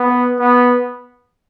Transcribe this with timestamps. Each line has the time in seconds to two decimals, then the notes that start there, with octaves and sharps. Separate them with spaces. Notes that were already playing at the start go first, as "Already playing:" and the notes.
Already playing: B3
0.39 B3